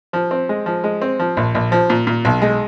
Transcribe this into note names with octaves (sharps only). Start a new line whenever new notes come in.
F3
C4
G#3
F3
G#3
C4
F3
A#1
A#1
F3
A#2
A#2
B1
G#3